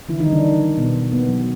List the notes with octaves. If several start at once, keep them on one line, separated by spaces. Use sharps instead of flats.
D3 E3 E4
D#3 D#4
G3
D3 D4
D3
D3
B2 B3
B2
A#3 B3
F#3